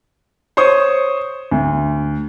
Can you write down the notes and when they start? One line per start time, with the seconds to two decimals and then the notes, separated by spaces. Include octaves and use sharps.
0.57 C5 C#5 C#6 D#6
1.51 D2